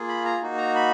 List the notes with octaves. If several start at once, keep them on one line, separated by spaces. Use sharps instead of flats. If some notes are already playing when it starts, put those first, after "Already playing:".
Already playing: A#3 F4 G#4
B5
A#5
A#3 D#4 F#4
A#5
B5